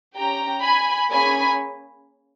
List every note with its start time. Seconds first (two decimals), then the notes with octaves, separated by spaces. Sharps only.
0.15 C#4 G4 G5 A#5
0.63 G#5 B5
1.10 A#3 C#4 G#4 G#5 B5